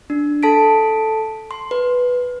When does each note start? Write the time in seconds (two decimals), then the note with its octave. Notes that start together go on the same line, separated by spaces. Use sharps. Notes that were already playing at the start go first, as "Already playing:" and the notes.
0.10 D4
0.43 A4 A5 B6 D7
1.51 C6
1.71 B4